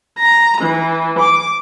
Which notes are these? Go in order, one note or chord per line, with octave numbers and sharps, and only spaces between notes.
A#5
E3
D6